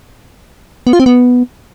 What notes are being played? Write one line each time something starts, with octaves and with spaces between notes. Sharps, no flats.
B3
F4
C4
B3